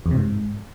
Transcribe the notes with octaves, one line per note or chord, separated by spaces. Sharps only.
E2
C3
G#2